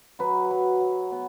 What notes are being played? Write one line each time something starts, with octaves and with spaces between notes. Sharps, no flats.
F#3 B4
F#3
F#3
B3